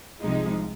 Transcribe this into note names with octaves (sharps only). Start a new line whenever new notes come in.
C2 C3 F3 G#3 D#4